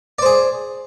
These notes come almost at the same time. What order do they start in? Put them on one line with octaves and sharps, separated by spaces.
D5 C5 G#4